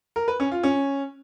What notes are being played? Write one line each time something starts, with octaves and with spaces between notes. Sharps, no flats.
A#4
B4
C#4
F4
C#4